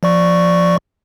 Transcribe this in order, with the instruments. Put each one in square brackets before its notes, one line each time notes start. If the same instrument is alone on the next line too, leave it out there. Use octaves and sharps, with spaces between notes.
[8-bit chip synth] F3 D5 C#6